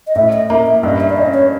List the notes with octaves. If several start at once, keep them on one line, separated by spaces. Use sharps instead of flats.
D#5
A2 E5
D#5
A#3 E5
E5
G2 D#5
E5
D5
C#4 D#5
C#5